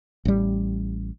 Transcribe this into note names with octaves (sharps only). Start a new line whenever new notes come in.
A1 G3